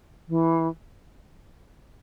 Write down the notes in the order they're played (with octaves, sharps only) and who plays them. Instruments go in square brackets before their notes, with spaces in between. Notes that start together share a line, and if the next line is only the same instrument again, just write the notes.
[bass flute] E3